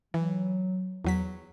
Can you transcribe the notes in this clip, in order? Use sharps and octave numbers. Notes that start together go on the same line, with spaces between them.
E3 F#3
E2 F#3 B6